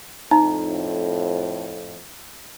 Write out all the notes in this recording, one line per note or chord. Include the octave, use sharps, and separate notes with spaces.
F2 A2 D#4 A#5